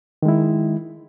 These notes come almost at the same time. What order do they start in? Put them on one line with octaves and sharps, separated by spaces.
D#3 G#3 E4